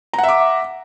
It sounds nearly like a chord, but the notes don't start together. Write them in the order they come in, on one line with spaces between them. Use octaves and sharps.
A#5 F#5 E5 D6